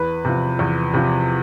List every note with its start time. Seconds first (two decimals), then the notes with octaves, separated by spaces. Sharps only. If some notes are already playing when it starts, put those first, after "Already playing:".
Already playing: E2 B4
0.25 C3 F3
0.59 E2
0.94 C3 F3